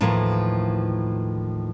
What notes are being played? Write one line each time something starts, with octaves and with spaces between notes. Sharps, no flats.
D#2 A2 E3 F3 A3 A#4